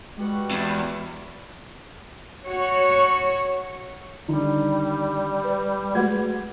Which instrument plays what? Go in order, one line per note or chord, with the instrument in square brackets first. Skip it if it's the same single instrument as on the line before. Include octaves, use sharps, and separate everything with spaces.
[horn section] G3 B3 F#4 [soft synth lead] G#3
[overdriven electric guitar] E2
[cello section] F#4 C#5
[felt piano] D3 D#3 D#4 [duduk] G3
[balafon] B4
[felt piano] G#3 B4 G#6 [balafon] A3 F#4 F#5